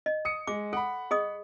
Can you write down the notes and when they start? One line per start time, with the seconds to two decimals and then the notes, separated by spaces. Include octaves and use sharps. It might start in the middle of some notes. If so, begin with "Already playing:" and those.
0.06 D#5
0.25 D#6 C#7
0.47 G#3 D6
0.73 A4 F#5 B5
1.11 G#4 D#5 D#6